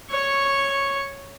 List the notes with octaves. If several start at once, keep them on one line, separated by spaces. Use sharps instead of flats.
C#5 C#6